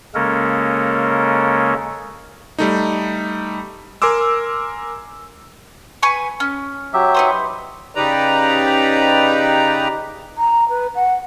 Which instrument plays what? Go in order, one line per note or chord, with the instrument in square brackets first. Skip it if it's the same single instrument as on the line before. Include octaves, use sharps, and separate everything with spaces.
[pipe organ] C#3 G#3 A#3 C#4 A4 A#4
[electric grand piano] G3 A3 D#4
A#4 G#5 C6 D6 E6
[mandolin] B4 G#5 C#6
C#4
[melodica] F#3 G4 E5
[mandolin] D#4 B4 C5
[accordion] C#3 D#4 G4 B4 D5 A#5
[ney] A#5
B4
F#5